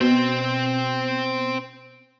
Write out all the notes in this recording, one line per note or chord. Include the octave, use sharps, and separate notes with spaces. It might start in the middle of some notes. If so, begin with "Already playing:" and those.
B2 C4 C5